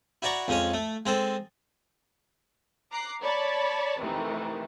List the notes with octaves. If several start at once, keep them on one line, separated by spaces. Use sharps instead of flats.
E4 F#4 D5 A#5 C#6
F2 G#3 C#4 C#5
A3
G#3 C4 A4
A#5 D6 F#6 C7
C#5 D5 A5 B5
F2 C3 D#3 E3 A3